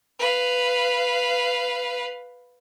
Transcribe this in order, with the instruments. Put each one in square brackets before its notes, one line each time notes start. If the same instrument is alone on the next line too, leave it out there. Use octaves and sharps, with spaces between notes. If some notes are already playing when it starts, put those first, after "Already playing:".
[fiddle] B4 F5